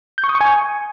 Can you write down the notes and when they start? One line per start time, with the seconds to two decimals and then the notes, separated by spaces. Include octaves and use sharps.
0.18 G6
0.24 C#6
0.29 D#6
0.35 C#6
0.41 G#5